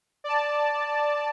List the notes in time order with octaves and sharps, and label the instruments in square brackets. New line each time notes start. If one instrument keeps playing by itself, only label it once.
[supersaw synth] D5 A5